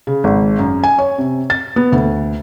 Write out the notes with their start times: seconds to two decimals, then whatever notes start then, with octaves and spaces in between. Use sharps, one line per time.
0.07 C#3
0.24 G#1
0.59 F#2
0.84 G#5
0.99 C#5
1.18 C3
1.50 A6
1.76 B3
1.92 D2